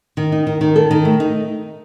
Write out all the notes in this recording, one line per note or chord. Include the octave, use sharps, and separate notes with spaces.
D#3
D#4
D#3
D#3
A4
D#3
A3
D#4